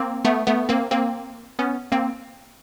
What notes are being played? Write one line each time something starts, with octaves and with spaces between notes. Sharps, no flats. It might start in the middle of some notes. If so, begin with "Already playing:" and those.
Already playing: A#3 C4
A3 B3
A3 B3
A#3 C4
A#3 C4
B3 C#4
A#3 C4